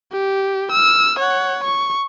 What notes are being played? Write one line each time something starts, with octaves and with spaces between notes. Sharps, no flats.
G4
E6 F6
C#5 F#5
C#6